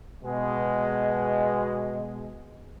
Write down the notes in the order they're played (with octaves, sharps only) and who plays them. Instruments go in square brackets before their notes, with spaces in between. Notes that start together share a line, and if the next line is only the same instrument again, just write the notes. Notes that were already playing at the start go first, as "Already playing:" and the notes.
[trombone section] B2 G#3